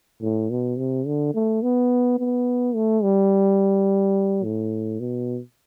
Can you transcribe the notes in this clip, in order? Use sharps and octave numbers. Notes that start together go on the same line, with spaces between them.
A2
B2
C3
D3
A3
B3
B3
A3
G3
A2
B2